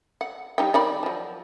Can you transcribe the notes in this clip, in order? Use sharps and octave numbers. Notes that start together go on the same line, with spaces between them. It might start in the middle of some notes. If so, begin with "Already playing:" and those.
F#5
G3 D#4 G5
D#3 D5 B5
F3 F#3